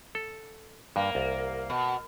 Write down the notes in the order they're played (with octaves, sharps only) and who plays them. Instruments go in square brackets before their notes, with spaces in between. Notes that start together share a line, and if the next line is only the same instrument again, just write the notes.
[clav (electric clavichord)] A4
[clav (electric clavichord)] G2 [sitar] A#3
[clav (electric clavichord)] C2
[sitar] B2